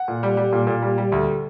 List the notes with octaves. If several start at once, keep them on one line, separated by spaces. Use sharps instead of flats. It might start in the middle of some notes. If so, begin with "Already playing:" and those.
Already playing: F#5
A#2
G3
G3
A#2
A#2
G3
G3
D2